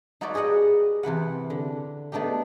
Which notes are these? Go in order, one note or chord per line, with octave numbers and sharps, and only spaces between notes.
D#4 F#4 B4 C#5 D5 E5
G4 G#4 D5 D#5 F#5
C3 E3 B4 F#5
D3
A3 B3 D4 D#4 G4